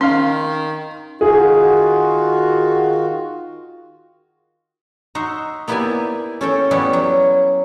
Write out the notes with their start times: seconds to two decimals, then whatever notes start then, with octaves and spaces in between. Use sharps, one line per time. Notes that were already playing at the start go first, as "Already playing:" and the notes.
0.01 D#3 C#4 F5 C6
1.21 D#3 F4 F#4 G#4
5.15 D#4 F#4 E5 C6
5.68 A#3 B3 E4 G4 D5 G#5
6.41 C#4 A4 G5
6.71 G3 B3 C#4 E4 F#4 G4
6.93 F#3